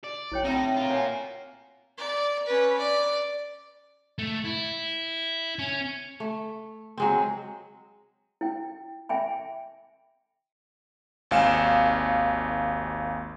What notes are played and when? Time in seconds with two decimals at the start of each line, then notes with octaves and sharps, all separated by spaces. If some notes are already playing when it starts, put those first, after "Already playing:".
0.04 D5
0.32 B1 E4 C#5 G5
0.44 A2 C4 D#4 F#4
0.76 F4 A#4
0.90 C#5 F#5 G#5
1.98 D5
2.46 C#4 B4
2.78 D5
4.18 A3
4.44 E4
5.59 C#4
6.20 A3
6.98 F#3 G#3 C4
8.41 E4 G5
9.09 E5 G5 G#5 B5
11.31 G#1 D#2 F5 G#5 C#7 E7